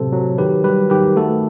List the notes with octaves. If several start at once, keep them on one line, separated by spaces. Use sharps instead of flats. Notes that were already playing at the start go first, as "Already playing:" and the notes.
Already playing: A2 C3 F#3 A4 C5
F#3
D#3 G4 B4
G3 G4 B4
D#3 G4 B4
A3 F#4 A4